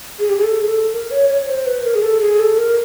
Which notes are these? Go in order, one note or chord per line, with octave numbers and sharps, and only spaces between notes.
G#4
G4
G#4
A4
G#4
A4
A#4
C#5
C#5
C#5
C5
B4
A#4
G#4
A4
G#4
A4
A#4